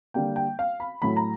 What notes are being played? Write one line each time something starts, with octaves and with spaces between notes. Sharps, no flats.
D3 G3 A#3 G5
G5
F5
B5
A2 F#3 A3 B5
A#5